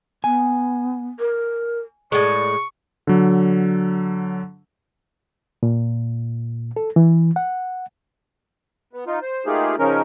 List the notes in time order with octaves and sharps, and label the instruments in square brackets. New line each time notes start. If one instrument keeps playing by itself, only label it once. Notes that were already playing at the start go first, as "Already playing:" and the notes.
[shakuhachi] B3 [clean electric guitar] G#5
[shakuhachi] A#4
[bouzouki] A2 G#3 [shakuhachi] D5 [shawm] C#6
[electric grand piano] D3 F#3
[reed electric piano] A#2
A4
E3
F#5
[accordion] B3
D#4 F4
C5
A3 A#3 D#4 F4 G4 G#4
C#3 F3 C#4 D#4 A#4